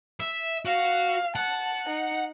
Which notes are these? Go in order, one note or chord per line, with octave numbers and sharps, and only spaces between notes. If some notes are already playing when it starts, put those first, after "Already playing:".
E5
F#4 F5
F#5 A5
D#4